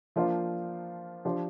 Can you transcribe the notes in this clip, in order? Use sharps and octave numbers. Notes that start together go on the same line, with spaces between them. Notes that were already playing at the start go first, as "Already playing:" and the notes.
F3 A#3 D4 F4 C5
F3 D4 G4 C5